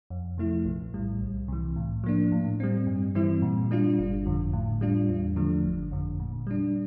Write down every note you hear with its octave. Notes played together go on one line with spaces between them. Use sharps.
F2
C3 F3 A3 E4
A#1
A2 G3
C2
C3 E3
A2
F3 A#3 D4
A2
G3 C4
G2
E3 G3 C4 E4
A#2
G3 D4 F4
G1
F2 D3
A2
G3 D4 F4
E2
D3 F3 A3 D4
G1
F2 D3
A#2
G3 D4